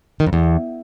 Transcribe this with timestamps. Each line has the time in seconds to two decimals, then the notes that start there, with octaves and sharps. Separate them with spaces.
0.20 D#3
0.26 F2
0.33 E2